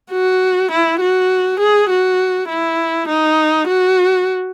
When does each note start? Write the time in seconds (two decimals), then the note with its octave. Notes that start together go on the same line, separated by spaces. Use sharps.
0.12 F#4
0.71 E4
1.00 F#4
1.60 G#4
1.90 F#4
2.49 E4
3.08 D#4
3.68 F#4